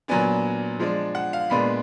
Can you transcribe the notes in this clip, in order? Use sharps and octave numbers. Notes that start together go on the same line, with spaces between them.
A#2 F#3 B3 D4 G#5
F3 G#3 D4
F#5
F5
A#2 G#3 B3 D4 B5